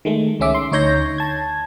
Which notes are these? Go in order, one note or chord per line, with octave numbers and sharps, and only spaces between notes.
D#3 G#3 A3
C#2 D#3 C#4 E5 D6
C6
D2 D#4 C#5 G6 A#6
A5 G#6